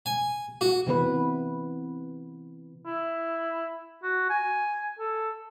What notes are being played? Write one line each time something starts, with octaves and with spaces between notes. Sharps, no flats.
G#5
F#4
C3 E3 B3 B4
E4
F#4
G#5
A4